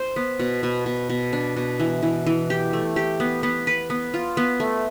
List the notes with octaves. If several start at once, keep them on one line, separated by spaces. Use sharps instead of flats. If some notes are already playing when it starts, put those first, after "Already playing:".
Already playing: C5
B3
B2
B2
B2
B2
D4
B2
E3
E3
E3
G4
A3
G4
B3
B3
B4
B3
F4
B3
A3